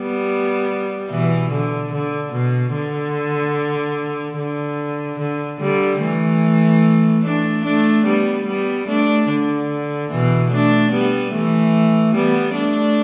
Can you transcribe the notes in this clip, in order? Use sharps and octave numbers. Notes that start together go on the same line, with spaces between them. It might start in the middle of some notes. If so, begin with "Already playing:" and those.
Already playing: G3 B3
B2 E3
D3
D3
B2
D3
D3
D3
D3 G3
E3 A3
A3 D4
A3 D4
G3 B3
G3 B3
A3 D4
D3
B2 E3
A3 D4
G3 B3
E3 A3
G3 B3
A3 D4